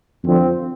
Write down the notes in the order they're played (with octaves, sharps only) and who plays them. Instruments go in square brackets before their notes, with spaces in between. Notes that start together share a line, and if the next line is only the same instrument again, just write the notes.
[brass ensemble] F2 D3 F3 C4